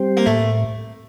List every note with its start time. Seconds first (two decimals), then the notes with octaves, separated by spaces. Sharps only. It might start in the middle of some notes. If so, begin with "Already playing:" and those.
Already playing: G3 C4 G4 C5
0.17 A#3
0.26 A2 A3